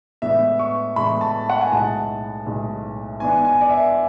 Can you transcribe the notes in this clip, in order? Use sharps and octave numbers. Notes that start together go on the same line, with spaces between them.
A2 E3 G#3 B3 D4 E5
C#6
A2 E3 G#3 B3 D4 B5
A5
F#5
G#5
B1 A2 G#3 A5
B1 A2 G#3
G#2 E3 B3 D4 G#5
G#5
D5
E5